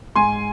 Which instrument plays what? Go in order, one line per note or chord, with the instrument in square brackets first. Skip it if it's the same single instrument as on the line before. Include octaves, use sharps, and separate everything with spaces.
[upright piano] G#2 G#5 C6